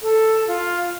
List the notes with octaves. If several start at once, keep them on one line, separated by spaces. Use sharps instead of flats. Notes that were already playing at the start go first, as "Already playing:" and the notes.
A4
F4